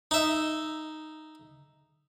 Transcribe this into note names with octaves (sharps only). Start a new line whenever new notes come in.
D#4 E5